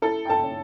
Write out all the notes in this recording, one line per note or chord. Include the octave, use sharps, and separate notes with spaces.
E4 A4 A5
G5
A4 A5
C#4